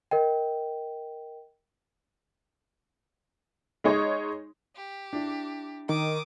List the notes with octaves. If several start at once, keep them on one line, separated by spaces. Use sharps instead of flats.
A#4 D#5 G5
G#3 D#4 C#5
G4
D4 E4
D#3 D6 D#6